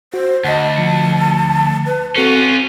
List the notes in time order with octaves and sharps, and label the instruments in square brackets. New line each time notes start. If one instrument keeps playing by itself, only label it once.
[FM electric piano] F#4 [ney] C5
[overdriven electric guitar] D2 [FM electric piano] D#5 F#5 [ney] A5
[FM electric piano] F3 C#7
[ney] B4
[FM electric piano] C4 A4 C7 [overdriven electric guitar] C#4 F4 [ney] F#4